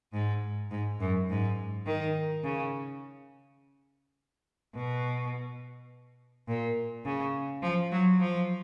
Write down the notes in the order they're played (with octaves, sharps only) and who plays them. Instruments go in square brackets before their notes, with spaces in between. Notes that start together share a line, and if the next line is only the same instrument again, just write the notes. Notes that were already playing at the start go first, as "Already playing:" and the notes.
[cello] G#2
G#2
F#2
G#2
D#3
C#3
B2
A#2
C#3
F3
F#3
F3